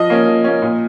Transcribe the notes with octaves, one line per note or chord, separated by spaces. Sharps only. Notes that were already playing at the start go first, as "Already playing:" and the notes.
Already playing: F3 D#5
A#3 C#4
F3
A#3 C#4
A#2